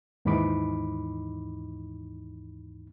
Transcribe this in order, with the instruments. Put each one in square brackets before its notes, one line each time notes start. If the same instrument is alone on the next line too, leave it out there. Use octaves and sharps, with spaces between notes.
[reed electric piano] D#2 G#2 E3 D#4 B5 D6